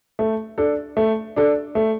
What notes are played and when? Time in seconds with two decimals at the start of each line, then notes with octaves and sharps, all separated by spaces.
0.19 A3
0.58 D4 A4
0.97 A3
1.36 D4 A4
1.75 A3